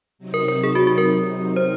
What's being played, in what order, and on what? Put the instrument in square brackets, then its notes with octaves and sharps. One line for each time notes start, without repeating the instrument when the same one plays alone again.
[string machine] C3 F#3 C4 D#4
[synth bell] A#4
A#4
G#4
F#4
F#4
A#4
C5